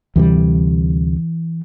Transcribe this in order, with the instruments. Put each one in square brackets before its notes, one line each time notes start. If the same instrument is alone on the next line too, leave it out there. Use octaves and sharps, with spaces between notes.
[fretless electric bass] D2 C3 G3 [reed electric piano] E3